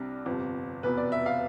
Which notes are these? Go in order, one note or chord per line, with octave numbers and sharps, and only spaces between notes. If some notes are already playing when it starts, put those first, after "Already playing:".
Already playing: C2 C3 G3 D4
G1 F2 C3
F1 E2 B2 B4
D5
E5
F5